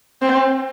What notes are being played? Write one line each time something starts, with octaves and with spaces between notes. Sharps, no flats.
C4